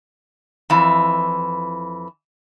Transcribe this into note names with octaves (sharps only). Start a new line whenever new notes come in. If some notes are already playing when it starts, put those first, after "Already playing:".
F2 E3